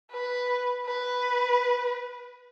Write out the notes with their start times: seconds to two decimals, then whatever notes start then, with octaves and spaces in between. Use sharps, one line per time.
0.12 B4
0.86 B4